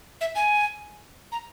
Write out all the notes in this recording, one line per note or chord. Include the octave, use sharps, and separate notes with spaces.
E5
G#5
A#5